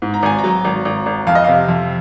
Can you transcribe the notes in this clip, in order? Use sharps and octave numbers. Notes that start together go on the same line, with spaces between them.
G#2
A#5
G#1 G#5
A#5
F#3
G#1
G#1
G#1
F2 F5
D#5
C3 F5
F2